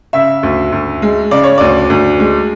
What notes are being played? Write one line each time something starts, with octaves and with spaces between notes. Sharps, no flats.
C#3 E5
D2
D2
G#3
C#3 D5
C#5
D2 D5
D2
G#3